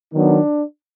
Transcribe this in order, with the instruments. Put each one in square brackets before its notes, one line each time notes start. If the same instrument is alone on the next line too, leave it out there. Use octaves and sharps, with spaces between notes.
[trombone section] D#3 F#3 B3 D4